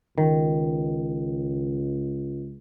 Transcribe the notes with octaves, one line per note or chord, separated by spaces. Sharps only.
C#2 D#3